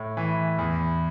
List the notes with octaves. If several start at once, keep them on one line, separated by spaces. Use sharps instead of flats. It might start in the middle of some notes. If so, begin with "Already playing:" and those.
Already playing: A2
E3
E2